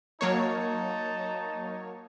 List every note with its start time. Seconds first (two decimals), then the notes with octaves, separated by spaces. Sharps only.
0.21 F#3 A#3 D#4 C#5 A5